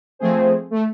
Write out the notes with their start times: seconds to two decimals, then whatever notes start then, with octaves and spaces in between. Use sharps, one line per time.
0.19 F3 A3 C4 G#4 C5
0.71 A3